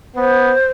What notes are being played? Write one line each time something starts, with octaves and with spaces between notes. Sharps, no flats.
B3 C5